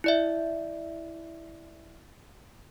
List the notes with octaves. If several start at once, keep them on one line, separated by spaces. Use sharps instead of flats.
E4 D5 E5